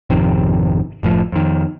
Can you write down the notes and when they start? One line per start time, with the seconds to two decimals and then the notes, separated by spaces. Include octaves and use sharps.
0.10 G#1 F2 C3 D#3
1.03 F#1 A2 F3
1.32 F2 D#3